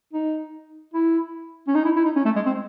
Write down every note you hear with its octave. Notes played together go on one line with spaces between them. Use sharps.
D#4
E4
C#4
D#4
E4
E4
D#4
C#4
A3
G#3
C4